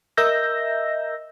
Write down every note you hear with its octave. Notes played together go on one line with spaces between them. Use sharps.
A#4 D#5 E5 E6 G6 A#6